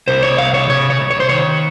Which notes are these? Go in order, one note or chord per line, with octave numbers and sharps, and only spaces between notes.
C2 C5
C#5
C2 F5
C#5
C3 C#5
C#5
C2
C#5
C5
D#3 C#5